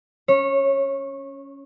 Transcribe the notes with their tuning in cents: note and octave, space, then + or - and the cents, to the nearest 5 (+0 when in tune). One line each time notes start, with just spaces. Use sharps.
C#4 +5 C#5 -20